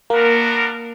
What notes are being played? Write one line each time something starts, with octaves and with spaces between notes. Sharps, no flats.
A#3 B3 D4 F#4 A#4